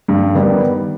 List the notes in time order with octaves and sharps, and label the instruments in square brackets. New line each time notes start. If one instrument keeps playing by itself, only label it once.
[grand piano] G2
D#3 G3 B3